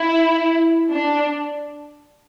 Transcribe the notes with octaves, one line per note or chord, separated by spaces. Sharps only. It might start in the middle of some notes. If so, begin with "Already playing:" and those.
Already playing: E4
D4